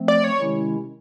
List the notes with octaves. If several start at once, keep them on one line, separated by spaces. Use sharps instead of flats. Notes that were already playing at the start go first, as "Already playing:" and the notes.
Already playing: F3 A3 C4
D5
C#5
C3 D#3 G#3 C#4 E4